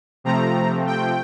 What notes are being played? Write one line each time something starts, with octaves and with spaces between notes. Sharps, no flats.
C3 F3 A3 C4 A#5
G5